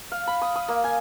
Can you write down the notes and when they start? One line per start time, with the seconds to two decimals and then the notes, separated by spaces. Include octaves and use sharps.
0.12 F5
0.27 B5
0.41 D#6
0.55 D#6
0.68 A#3
0.84 G#5